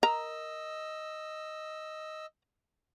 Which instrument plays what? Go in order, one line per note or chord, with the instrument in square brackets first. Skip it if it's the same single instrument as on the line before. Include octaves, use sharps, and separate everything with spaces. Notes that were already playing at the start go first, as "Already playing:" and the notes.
[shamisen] A#4 A#5 [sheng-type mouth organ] D#5 E6